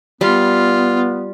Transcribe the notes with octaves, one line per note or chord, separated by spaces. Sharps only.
G3 B3 F4